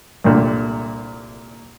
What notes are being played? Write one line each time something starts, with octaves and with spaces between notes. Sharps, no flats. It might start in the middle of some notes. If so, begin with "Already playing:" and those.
C2 G2 A#2 D3